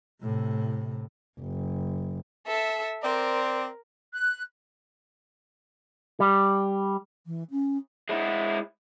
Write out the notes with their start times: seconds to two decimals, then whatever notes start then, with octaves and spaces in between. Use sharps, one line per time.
0.23 A2 C3
1.40 F#1
2.47 A4 E5
3.03 C4 A#4 C5 D5
4.13 F#6
6.20 G3
7.26 E3
7.51 C#4
8.09 G#3 E4